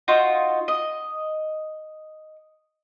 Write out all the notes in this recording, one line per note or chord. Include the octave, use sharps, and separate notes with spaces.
D#4 F4 F#4
D#5